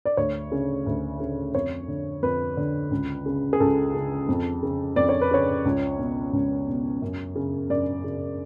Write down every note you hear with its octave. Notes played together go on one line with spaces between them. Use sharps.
D5
D2 C#5
C#3
D2
C#3
F2 C#5
D3
F2 B4
D3
C#2
C#3
G#4
C#2 A4
C#3
F2
C#3
F2 D5
C#5
B4
C#3 C#5
C#2
B2
C#2
B2
F#2
C#3
F#2 D5
C#3